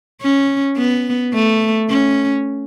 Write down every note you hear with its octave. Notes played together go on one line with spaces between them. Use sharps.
C#4
B3
A3
C#4